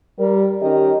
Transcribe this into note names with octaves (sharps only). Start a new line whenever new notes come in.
G3 A#4
D#3 C#4 G4 A#4 D#5